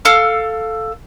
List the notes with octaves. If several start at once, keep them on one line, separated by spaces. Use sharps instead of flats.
A4 F5 E6 F6